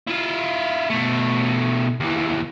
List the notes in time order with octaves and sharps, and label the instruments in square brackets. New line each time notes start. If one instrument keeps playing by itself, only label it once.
[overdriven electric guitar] E4 F4
B2 A3
D#2 E3